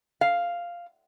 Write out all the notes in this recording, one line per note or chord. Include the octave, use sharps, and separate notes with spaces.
F5